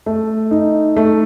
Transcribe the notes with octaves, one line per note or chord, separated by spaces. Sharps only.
A3
D#4
A3